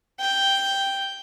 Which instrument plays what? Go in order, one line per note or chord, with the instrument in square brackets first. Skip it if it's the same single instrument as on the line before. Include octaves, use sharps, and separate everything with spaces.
[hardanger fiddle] G5